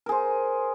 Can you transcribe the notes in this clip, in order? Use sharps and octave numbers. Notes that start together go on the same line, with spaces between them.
G#4 A#4 C5